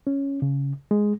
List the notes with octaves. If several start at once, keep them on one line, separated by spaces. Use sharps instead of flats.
C#4
C#3
G#3